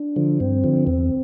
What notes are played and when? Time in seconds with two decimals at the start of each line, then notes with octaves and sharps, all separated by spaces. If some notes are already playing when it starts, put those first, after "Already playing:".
Already playing: D4
0.16 D3 F3
0.40 G2 C4
0.64 D3 F3
0.87 E2 C4